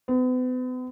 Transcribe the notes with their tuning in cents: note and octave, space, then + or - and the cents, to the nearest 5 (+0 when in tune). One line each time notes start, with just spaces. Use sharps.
B3 +40